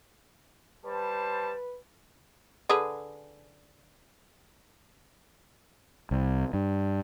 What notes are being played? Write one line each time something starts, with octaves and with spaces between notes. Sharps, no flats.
G3 B4 C5 A5
D3 G#4 B4
C2
G2